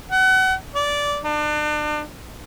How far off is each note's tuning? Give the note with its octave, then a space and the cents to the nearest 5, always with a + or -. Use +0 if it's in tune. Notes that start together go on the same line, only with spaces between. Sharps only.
F#5 +30
D5 -15
D4 +35